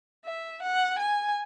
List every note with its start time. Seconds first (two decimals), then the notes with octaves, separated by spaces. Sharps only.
0.25 E5
0.63 F#5
0.99 G#5